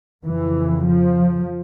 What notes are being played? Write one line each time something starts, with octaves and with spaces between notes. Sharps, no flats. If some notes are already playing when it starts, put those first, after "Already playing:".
F2 C#3 E3
F3